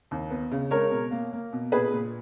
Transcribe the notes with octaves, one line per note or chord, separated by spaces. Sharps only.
D#2
B3
C#3
G#3 A#4 C#5
B2
A#3
A#3
B2
A#2 G#4 B4
A#2